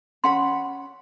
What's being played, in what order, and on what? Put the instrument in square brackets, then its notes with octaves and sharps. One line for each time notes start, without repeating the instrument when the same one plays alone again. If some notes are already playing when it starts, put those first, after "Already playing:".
[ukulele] C#4 F#5 B5 [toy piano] C6